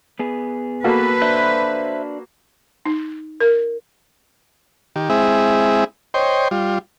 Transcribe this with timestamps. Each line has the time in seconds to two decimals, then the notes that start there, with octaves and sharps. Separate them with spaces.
0.19 B3 G#4
0.84 A#3 F#4 A4 B4
1.22 D4 C5 E5 F#6
2.86 D#4
3.40 A#4
4.96 D#3 G4
5.10 G#3 C4 E4 G#4 E5
6.14 C5 C#5 D#5 G5 C6
6.51 G3 F4